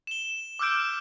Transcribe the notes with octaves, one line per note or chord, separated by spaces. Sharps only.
E7 G7
D6 E6 F6 G6 D7